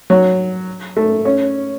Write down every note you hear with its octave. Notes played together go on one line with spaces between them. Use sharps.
F#3
A3
C#4